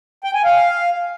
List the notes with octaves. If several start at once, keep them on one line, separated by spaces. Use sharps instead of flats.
G5
G#5
F5